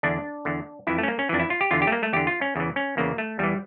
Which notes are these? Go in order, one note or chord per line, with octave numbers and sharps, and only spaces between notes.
E2 D3 D4
E2 D3
F2 E3 E4
A3
C#4
A#3
C#4
F2 E3 D4
E4
F4
G4
E2 D3 F4
G4
A3
A#3
A3
E2 D3 G4
F4
C#4
E2 C#3 E3
C#4
E2 C#3 E3 A#3
A3
E2 E3 G3